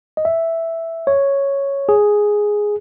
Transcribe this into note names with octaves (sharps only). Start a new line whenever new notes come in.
D#5
E5
C#5
G#4